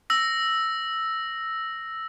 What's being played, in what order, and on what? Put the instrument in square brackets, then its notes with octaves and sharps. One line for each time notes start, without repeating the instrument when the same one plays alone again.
[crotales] E6 A#6